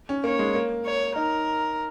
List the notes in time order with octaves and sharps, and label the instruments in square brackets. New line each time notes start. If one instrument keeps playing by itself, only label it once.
[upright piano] C#4
[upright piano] A#3 [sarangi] C#5
[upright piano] G#3
A#3
[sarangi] C#5
[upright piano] D#4 [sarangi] A#4